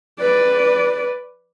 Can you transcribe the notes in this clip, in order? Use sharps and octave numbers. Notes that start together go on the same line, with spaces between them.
B4 D5